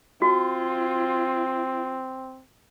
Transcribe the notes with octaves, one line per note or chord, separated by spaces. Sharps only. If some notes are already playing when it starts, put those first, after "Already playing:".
C4 F4 F#4